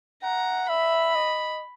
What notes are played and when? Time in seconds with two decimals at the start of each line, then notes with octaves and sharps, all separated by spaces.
0.23 F#5 A#5
0.69 E5 B5
1.15 D#5